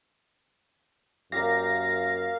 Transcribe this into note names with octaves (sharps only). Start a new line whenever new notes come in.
F#2 A#3 G4 F5 A#6